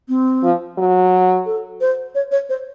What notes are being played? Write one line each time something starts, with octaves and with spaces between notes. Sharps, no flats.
C4
F3
F#3
A4
C5
C#5
C#5
C5